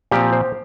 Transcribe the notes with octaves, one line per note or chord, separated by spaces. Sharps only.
A#2 F3 C4 G4
C5